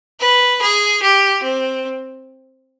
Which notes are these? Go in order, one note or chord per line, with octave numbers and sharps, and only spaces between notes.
B4
G#4
G4
C4